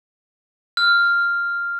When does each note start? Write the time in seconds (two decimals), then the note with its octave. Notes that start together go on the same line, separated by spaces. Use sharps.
0.77 F6